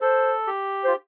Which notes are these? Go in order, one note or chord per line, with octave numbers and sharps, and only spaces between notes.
A4 C5
G4
F4 C5